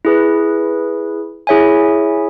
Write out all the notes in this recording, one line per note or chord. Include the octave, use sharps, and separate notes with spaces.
E4 G#4 B4
E4 G#4 C#5 E5 G#5